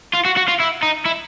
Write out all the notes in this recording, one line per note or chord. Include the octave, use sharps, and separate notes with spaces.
F4
F#4
F#4
F4
E4
D#4
E4